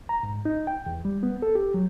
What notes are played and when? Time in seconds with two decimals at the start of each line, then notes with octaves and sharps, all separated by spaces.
0.09 A#5
0.23 G#2
0.45 D#4
0.67 G5
0.86 E2
1.05 G3
1.23 B3
1.42 A4
1.55 G4
1.74 F#3